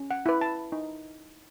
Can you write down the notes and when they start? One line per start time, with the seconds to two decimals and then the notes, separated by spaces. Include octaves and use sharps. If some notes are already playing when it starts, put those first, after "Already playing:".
Already playing: C#4
0.11 F#5
0.26 E4 B4
0.41 A5
0.72 D#4